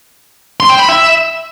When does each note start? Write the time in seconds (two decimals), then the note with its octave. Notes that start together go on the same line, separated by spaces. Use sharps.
0.60 C6
0.70 G5
0.79 B5
0.89 E5